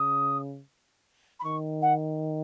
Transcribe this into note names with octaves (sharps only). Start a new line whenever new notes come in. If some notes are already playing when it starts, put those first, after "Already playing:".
Already playing: C#3 D#6
B5
D#3 C#6
F#5